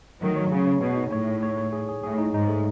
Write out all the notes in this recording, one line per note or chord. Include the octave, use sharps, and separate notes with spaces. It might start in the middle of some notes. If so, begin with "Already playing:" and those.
D#3 F#3 A3
C#5
C#3 G#4
C#5
B2 C#5
D#4
A2 C#5
A3
C#5
C#5
G#4
G#4
A2 G#4
D#4
G#2 D#4
A3